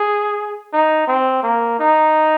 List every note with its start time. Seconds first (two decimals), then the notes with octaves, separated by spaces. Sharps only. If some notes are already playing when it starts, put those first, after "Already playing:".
Already playing: G#4
0.73 D#4
1.07 C4
1.43 A#3
1.79 D#4